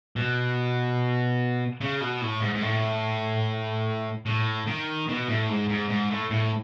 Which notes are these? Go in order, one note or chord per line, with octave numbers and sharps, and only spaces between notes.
B2
C#3
B2
A2
G#2
G#2
A2
A2
D#3
B2
A2
G#2
G#2
G#2
A2
A2